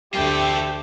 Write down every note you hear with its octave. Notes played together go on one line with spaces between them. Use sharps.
D2 A3 F4 G4 A4 G5